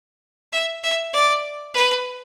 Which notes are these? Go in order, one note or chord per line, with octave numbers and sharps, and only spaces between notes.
E5
E5
D5
B4